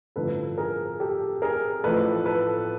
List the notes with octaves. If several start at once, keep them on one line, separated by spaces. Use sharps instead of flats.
A1 G2 D3 F3 A4 B4
G#4 A#4
G4 A4
G#4 A#4
A1 A2 F3 A4 B4
A4 B4